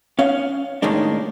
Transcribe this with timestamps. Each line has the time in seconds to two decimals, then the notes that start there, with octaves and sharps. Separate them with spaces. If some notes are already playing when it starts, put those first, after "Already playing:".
0.19 C#4 F5
0.82 D#2 A2 D#3 G#3 A#3 D4